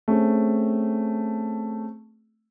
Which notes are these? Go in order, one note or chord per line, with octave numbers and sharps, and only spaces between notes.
A3 C4 C#4 G#4